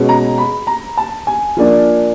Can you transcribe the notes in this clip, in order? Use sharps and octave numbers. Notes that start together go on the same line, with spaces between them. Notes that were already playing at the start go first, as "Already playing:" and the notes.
Already playing: B2 G#3 C#4
A#5
B5
A#5
A5
G#5
F3 A#3 D4